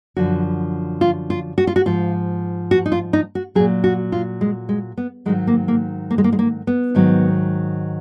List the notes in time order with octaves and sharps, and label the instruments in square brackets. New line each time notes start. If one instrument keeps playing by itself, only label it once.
[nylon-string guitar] F#2 D3 F3 F#4
F4
F4
F#4
F4
F#4
G#2 F3 F4
F#4
D#4
F4
D#4
F#4
A#2 F#3 G#4
F#4
F4
G#3
G#3
B3
G#2 D#3 F#3 G#3
A#3
A#3
A#3
G#3
A#3
G#3
A#3
B3
G#2 D#3 F#3